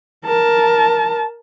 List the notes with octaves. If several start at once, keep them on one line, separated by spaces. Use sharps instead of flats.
A#4 A5